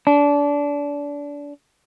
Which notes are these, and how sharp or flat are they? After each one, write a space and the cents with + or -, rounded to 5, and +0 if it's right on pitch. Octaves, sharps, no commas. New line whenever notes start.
D4 -25